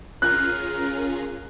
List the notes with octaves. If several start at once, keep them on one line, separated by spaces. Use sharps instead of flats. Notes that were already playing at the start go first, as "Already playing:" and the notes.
C#4 F4 G#4 A#4 F#6